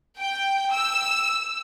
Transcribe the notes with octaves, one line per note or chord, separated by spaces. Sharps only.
G5
E6